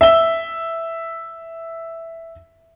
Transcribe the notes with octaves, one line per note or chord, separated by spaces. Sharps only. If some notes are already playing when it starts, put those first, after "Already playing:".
E5 G7